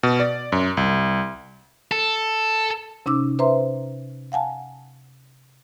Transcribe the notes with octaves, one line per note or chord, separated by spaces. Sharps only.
B2
D5
F#2
C2
A4
C3 C#4 D#4 D6 E6
B4 C5 E5 A#5 C6
F5 F#5 G#5 A5